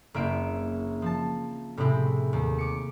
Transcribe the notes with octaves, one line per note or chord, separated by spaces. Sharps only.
F#1 A#3 C4 E4 E5 D7
F3 A5
A2 C3 G#3 C4 E4
D#2
D6 C#7